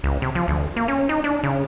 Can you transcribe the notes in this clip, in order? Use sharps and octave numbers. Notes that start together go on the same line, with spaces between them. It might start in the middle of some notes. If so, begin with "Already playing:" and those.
C#2
C3
F3
D2
A#3
C#4
D#4
D4
C#3